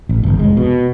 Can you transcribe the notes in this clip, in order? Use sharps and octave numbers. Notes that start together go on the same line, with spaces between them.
A1
G1
F1 G#3
B2